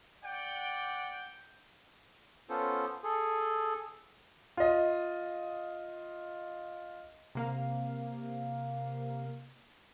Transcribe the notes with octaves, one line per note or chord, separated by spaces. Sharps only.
D5 F#5 G5
B3 C#4 F4 A4 C5
G#4 A4
F4 D#5
C3 A#3 F5